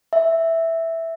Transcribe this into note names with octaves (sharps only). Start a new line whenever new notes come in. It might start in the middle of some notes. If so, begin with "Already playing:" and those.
E5